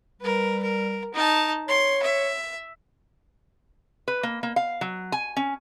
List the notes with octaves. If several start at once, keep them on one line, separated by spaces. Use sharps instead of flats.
G3 A#4 B4
A#4
D#4 A5
C#5 C6
E5
B4
A#3
A#3
F5
F#3
G#5
C#4